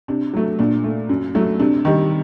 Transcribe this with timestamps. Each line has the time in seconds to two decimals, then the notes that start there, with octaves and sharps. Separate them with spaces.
0.08 C3 D4
0.34 F#3 A3
0.59 A#2 D4
0.84 A3
1.09 F#2
1.35 F#3 A3
1.60 C3 D4
1.85 D#3 G3